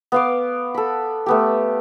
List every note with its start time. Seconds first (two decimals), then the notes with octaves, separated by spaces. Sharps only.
0.12 B3 F5 D6
0.74 A4 B5
1.26 A3 B3 G4